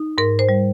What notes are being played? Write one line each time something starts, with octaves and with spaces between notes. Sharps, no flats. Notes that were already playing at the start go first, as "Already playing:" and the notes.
Already playing: D#4
G#2 A#4
C5
G3